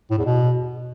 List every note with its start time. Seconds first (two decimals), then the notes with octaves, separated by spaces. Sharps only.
0.11 A2
0.18 E2
0.26 B2